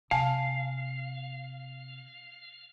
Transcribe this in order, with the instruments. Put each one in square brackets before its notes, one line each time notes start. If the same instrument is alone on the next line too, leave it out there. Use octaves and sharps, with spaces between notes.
[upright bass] C3 [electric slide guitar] F5 [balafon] G#5 A5